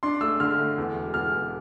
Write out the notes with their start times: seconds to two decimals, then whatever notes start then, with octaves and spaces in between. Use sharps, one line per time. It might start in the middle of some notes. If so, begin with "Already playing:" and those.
0.03 D4 C6
0.21 A3 E6
0.40 D3 F6
0.58 A3
0.78 E2
0.95 E1
1.14 E2 F6
1.33 E2